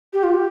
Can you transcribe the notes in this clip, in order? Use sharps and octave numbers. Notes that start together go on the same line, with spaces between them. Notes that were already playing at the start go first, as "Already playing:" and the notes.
G4
F4
G4